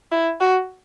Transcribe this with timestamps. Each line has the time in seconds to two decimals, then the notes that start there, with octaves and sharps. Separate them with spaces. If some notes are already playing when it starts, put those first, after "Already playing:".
0.12 E4
0.40 F#4